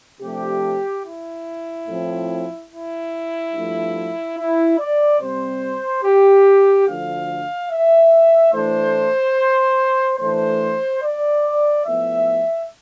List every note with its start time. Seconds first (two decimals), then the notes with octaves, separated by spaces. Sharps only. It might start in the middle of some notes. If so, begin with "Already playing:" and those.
0.21 C3 F3 A3 D4 G4
1.04 E4
1.88 A2 F3 C4
2.70 E4
3.54 G2 F3 A3
4.37 E4
4.78 D5
5.20 C3 G3 C4 C5
6.04 G4
6.86 D2 D3 F3 F5
7.70 E5
8.53 A2 E3 A3 D4 C5
10.19 A2 E3 A3 D4 C5
11.02 D5
11.85 A2 F3 B3 E5